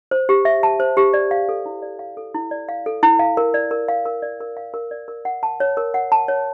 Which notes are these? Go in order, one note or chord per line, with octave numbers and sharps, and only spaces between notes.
C5
G4
E5
A5
C5
G4
D5
F5
A4
E4
D5
F5
A4
E4
D5
F5
A4
E4
F5
A#4
D5
A#4
F5
A#4
D5
A#4
F5
A#4
D5
A#4
F#5
A5
C#5
A#4
F#5
A5
C#5